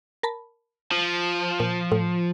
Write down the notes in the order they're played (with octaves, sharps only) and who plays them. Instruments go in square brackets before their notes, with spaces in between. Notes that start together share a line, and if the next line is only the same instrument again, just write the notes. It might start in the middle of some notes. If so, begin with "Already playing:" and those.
[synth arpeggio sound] A#4 A5 B5
[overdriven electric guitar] F3
[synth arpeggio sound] A#2
A2